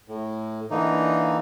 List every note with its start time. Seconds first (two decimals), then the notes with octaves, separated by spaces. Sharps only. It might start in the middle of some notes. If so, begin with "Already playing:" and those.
0.08 A2
0.71 D3 E3 A#3 D#4